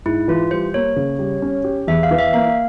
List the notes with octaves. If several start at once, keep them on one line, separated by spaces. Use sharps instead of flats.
G#2 E4
E3 F4
G3 C5
A#3 C#5
C#3
G3
C#4
G4
E2 E5
F5
E3
E5
A#3 F5